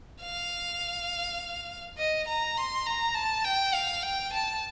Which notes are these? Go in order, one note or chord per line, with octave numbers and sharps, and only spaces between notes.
F5
D#5
A#5
C6
A#5
A5
G5
F5
G5
A5